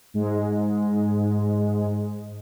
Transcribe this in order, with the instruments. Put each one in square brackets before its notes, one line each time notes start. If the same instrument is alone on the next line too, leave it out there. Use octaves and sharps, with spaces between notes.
[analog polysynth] G#2 G#3